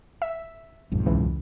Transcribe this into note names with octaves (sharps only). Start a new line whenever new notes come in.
E5
B1 F2 G#2
C#2 E3